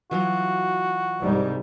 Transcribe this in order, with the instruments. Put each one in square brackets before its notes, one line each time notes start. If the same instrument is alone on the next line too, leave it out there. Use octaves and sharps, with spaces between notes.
[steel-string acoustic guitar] E3 F#3 F4 [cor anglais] F#4
[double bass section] C2 G#2 G3